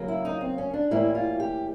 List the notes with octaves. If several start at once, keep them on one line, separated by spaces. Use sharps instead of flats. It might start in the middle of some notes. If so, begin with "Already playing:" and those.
Already playing: C#3 F#3 A#3
E4
D#4
C4
C#4
D4
A2 E3 G3 A#3 E4
F4
G4